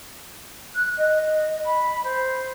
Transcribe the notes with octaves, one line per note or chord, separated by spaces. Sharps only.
F#6
D#5
B5
C5